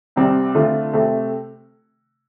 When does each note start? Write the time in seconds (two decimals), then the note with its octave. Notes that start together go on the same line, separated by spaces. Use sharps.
0.16 C2 C3 G3 C4
0.55 D3 A3 C4 F4
0.93 C3 A3 C4 G4